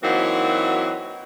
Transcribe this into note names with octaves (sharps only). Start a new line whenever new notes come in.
E3 F#3 A#3 C4 D#4 F#4